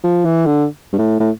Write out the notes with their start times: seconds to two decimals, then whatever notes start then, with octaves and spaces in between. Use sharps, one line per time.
0.04 F3
0.25 E3
0.46 D3
0.93 G2
0.98 A2
1.20 A2